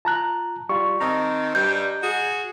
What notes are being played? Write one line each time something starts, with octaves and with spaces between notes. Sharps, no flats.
F4 A5 A#5 F#6
G3 F4 C#6
D#3 C4 D#5 A5 A#5
G2 G3 G6
F#4 G#4